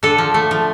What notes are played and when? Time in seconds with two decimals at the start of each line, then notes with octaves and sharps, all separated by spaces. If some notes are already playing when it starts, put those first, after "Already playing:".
0.03 D3 A4
0.18 F3
0.34 A3
0.51 F3